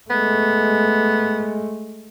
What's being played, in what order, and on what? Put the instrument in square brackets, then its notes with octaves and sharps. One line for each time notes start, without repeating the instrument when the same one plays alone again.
[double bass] G#3 A3 [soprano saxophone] B3